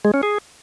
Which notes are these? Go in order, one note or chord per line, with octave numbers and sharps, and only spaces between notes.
G#3
C#4
G#4